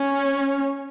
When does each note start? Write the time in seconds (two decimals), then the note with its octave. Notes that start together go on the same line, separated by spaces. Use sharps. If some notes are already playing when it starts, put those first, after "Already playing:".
Already playing: C#4